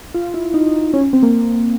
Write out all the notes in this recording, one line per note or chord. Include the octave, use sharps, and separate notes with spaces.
F4
E4
D#4
C#4
C4
A#3